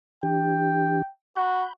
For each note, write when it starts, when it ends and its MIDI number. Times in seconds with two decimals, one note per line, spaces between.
0.23 1.02 52
0.23 1.02 62
0.23 1.02 67
0.23 1.09 79
1.36 1.66 66
1.36 1.73 83
1.36 1.73 91